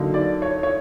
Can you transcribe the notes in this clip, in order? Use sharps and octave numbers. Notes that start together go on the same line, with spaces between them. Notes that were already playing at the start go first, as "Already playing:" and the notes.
Already playing: D3 F#3 A#3 D#4
D5
C#5
C#5